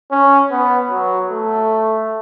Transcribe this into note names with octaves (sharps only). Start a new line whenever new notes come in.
C#4
B3
F#3
A3